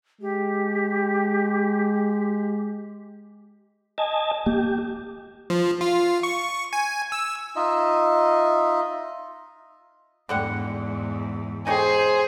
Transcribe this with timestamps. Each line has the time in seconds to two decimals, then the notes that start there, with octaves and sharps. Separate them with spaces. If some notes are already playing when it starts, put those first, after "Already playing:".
0.21 G#3 G4
3.98 D#5 G#5 A5
4.46 A#3 G4
5.50 F3
5.81 F4
6.23 C#6
6.73 G#5
7.12 E6
7.56 D#4 F4 D#5 E5
10.29 E2 G#2 D3 G3 F#5
11.67 D#4 G4 G#4 C5 C#5